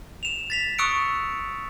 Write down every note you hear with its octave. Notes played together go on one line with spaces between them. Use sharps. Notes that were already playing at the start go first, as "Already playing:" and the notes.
E7 F7
A6 B6 F7
C#6 D#6 E6 F#6 C#7 D7